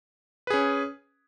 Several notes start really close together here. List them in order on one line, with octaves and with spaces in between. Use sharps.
B4 G#4 C#4